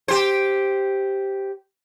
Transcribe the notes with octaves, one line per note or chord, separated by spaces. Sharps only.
G4 C5